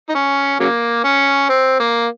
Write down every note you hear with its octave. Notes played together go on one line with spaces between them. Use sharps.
D#4
C#4
C#3 F#3 A#3
C#4
C4
A#3